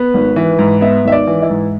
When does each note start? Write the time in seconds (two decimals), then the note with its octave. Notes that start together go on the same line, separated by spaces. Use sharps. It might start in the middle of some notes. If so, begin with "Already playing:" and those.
Already playing: B3 B4
0.14 G#1
0.36 E3
0.59 G#2
0.81 B3 E5
1.05 G#1 E5
1.12 D5
1.27 E3
1.42 E4
1.50 G#2